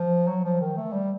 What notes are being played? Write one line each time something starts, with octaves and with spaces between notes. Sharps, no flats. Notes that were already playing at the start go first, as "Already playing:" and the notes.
Already playing: F3
F#3
F3
D#3
A3
G3